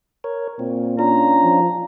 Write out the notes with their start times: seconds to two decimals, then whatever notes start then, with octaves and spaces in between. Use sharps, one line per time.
0.24 A#4 C#5
0.59 A#2 C4
0.99 C#4 D4 F4 A#5
1.44 F3